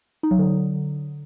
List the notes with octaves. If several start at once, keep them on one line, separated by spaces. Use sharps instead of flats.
D#4
F#3
D3